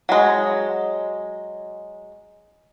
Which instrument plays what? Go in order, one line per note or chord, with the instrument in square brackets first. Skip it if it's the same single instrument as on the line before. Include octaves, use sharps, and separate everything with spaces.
[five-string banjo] F#3 G#3